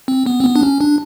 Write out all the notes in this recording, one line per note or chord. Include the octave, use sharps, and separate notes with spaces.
C4
B3
C4
B3
D4
C#4
D4